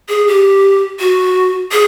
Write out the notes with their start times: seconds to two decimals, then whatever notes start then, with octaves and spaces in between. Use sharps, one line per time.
0.09 G#4
0.28 G4
1.00 F#4
1.72 G#4